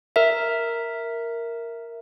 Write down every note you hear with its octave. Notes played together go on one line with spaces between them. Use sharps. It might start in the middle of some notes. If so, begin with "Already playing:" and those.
A#4 E5